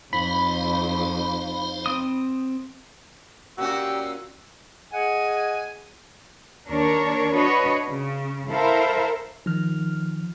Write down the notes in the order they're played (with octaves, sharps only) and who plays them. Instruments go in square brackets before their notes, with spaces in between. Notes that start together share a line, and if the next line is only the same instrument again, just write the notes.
[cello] F2 [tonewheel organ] D#4 C5 F5 [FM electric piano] B5
[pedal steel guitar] C4 D#6
[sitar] A#2 C#4 F#4 [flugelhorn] G4 [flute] E6
[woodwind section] G#4 D#5 F#5 G#5
[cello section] D#2 D4 A#4 C#5
D4 F#4 B4 C#5 D#5
C#3
E4 A4 A#4 C5 E5 F5
[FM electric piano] D#3 F6 [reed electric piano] F3